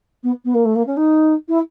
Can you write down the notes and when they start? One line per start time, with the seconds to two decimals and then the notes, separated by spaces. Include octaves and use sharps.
0.23 B3
0.45 B3
0.54 A#3
0.65 A3
0.75 A#3
0.86 C#4
0.97 D#4
1.48 E4